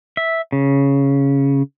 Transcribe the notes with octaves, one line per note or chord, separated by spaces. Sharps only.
E5
C#3